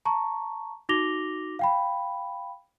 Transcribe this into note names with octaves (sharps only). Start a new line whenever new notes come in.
A5 A#5 C#6
D#4 F#4 D6 A#6 F7 G7
F5 G5 B5